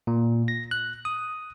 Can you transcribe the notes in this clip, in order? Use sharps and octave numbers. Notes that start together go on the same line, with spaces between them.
A#2
A#6
F#6
D#6